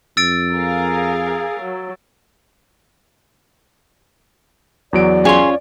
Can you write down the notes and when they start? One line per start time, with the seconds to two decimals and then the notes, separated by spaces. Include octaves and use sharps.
0.17 F2 E6 A6 D7
0.52 G#4 A#4 F5
1.60 F#3
4.93 E2 F#3 D5 D7
5.25 C#4 F4 G#4 C#5 C6